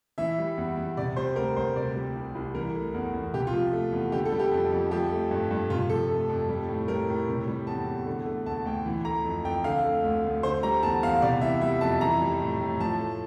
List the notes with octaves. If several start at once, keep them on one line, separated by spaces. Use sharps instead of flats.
E3 E5
G3
E2
E2
C3 D5
G3 C5
D2 A#4
D2 C5
C3 D5
G3
C2
C2
E3 A#4
A3
E2
E2
C3 G4
F4
F3
A3
E2
D3 G4
A4
G3
G4
F2
F2
F3 G4
A3
G2
G2
C3 F4
F3 A4
A3
F2
G3
A2
G3 A#4
A2
C3
G3
E2 A5
E2
D3
A3
D2 A5
D2 G5
E3
A3 A#5
F2
F2 G5
D3 F5
A3
D2
D2
D3 C5
G3 A#5
E2 A5
E2 F5
C3 D5
E3 E5
G3 E5
F2 A5
E3 A#5
G3
A2
A2
F3 A5
A3